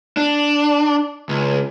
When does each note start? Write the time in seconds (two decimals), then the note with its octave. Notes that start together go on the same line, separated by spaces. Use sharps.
0.17 D4
1.29 C#2